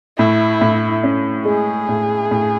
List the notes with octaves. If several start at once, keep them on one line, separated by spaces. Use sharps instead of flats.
A2 E4
A2
C#4
G#3 G#4
A2
A2